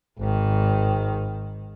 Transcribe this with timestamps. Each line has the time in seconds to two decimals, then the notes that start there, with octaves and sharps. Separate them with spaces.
0.18 G#1 D#3